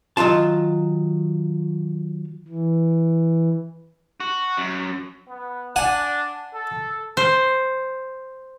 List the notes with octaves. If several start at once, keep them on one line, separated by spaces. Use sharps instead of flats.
D#3 F#3 C4 F4 A5
E3
F#4
F#2
B3
D4 F#5 G#5
A4
C5